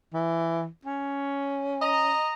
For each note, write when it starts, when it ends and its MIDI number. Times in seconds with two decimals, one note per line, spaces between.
0.13 0.68 52
0.85 2.18 61
1.81 2.33 75
1.81 2.33 82